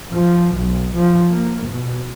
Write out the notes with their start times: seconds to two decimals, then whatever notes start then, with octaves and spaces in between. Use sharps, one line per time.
0.13 F3
0.55 B1
0.96 F3
1.28 A#3
1.64 B2